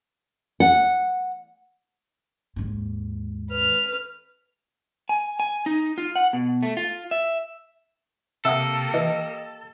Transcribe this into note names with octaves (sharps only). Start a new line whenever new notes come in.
F#5
D#2 G#2
B4 F6
G#5
G#5
D#4
F4
F#5
B2
A3
F4
E5
C3 A#3 G4 A4 E5 F#5 D#6
E3 D#5